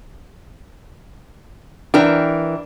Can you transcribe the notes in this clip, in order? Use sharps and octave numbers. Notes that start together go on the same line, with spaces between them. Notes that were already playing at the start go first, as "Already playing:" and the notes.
E3 D4 A#4 G5